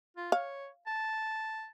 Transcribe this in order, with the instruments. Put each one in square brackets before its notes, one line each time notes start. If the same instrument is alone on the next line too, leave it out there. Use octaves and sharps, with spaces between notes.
[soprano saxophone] F4
[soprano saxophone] C#5 [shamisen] F5
[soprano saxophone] A5